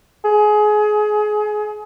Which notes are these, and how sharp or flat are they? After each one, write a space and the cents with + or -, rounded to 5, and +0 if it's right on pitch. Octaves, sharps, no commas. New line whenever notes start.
G#4 +25